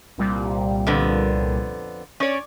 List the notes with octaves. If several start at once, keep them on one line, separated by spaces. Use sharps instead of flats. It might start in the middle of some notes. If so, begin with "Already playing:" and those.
C2 A#2 G3
F2 D3 B3
C#4 C#5 D5